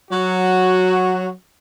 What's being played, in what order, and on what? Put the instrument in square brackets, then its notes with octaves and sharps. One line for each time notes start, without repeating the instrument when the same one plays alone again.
[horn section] F#3 F#4